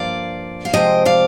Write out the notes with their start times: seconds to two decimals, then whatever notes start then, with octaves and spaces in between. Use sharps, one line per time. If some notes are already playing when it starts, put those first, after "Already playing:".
Already playing: G2 F3 A#3 D5 F5
0.65 F5
0.73 C3 F3 G#3 C4 D#5 G5
1.05 D5 F5